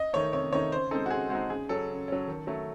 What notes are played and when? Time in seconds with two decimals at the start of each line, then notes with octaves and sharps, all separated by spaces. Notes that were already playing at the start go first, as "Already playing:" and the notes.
Already playing: D#5
0.13 D#3 A3 D#4 C#5
0.33 C3 C#5
0.52 D#3 A3 D#4 C#5
0.72 C#3 C5
0.91 G#3 C4 D#4 A4
1.06 F#4
1.10 C#3 G#4
1.30 G#3 C4 D#4 F#4
1.50 C#3 G#4
1.69 F#3 C#4 A4
1.90 C#3
2.08 F#3 C#4
2.28 D#3
2.47 F#3 A3